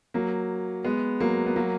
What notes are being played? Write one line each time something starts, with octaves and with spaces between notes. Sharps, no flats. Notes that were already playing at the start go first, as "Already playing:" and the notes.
F#3 A#3
G#3 B3
F#3 A#3
B3
F#3 A#3